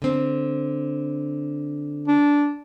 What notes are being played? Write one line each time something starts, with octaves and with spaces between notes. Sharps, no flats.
D3 C4
D4